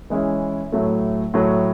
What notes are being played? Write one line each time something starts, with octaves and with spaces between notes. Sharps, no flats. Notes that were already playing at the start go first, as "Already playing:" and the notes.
E3 G#3 C#4 E4
A2 F#3 A3
A2 F#3 A3